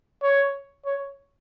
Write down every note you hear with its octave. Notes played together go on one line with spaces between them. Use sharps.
C#5
C#5